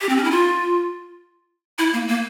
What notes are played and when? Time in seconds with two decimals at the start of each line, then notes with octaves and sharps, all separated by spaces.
0.01 G4
0.09 C4
0.17 C#4
0.24 E4
0.31 F4
1.78 E4
1.93 A#3
2.08 A#3